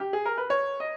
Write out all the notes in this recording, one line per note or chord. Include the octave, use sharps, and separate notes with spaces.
G4
G#4
A#4
B4
C#5
D#5